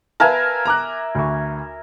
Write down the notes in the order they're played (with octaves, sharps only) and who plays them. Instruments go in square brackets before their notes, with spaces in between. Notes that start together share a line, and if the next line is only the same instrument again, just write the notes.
[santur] A#4 E5 G#5 [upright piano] B4 F5 A5
[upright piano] A#5 D6 F#6
D2 C#6